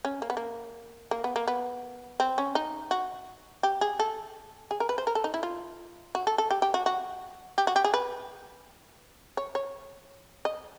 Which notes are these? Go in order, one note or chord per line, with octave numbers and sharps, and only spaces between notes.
C#4
A#3
B3
A#3
A#3
B3
A#3
B3
C4
C#4
D#4
F#4
G4
G#4
A4
G#4
A#4
B4
C5
A#4
A4
D#4
E4
F4
F#4
A4
A4
G4
G4
F#4
F#4
G4
F#4
G4
G#4
B4
C#5
C#5
D#5